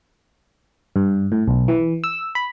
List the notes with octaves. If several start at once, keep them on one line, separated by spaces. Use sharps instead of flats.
G2
A2
B1
E3
E6
B5